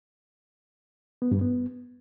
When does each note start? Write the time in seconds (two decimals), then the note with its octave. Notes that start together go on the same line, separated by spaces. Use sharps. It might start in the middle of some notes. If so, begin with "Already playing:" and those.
1.22 B3
1.31 G2
1.41 B3